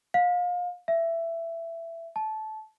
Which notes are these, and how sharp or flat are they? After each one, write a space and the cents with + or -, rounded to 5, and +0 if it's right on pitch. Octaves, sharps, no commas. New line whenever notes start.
F5 +30
E5 +15
A5 -20